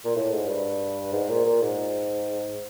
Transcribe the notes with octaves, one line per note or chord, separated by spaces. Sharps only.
A#2
A2
G#2
G2
G#2
A#2
A#2
G#2